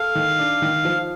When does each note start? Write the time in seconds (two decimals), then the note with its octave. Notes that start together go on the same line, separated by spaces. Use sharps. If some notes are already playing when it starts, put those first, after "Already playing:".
Already playing: A4 F5
0.15 D#3
0.39 D4
0.62 D#3
0.85 F3